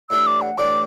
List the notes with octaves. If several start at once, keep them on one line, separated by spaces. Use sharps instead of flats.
A2 E3 G3 D4 E6
D6
F#5
A2 E3 G3 D4 D6